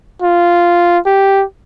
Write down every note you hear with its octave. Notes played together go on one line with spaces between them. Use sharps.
F4
G4